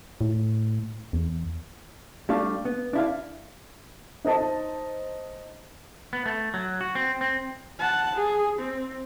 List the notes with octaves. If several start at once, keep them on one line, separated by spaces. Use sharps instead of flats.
A2
E2
G3 A3 D4 F5
B3
D4 E4 F5
D#4 C5 D#5 A5
B3
A3
F#3
F#4
C4
C4
F#5 A5
G#4
C4